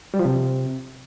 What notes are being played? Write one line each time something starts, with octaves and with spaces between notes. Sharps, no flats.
G3
F3
C3